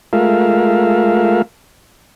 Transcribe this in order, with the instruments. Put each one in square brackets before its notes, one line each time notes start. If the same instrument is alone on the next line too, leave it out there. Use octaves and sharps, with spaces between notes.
[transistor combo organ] G#3 A3 F4 A#4 E5 F5